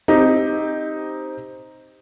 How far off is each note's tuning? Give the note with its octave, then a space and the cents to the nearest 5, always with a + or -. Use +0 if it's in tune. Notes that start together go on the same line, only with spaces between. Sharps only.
C4 +0 D#4 +0 G4 +10